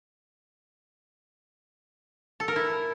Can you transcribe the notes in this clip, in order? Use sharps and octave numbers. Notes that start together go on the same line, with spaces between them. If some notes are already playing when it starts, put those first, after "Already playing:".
A4
A#4
E4